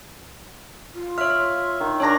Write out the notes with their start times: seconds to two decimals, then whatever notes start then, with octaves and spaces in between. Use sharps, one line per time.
0.95 F4
1.18 C#5 E5 F6
1.80 D#3
2.00 C#4 D4 A#4 C#5 A#6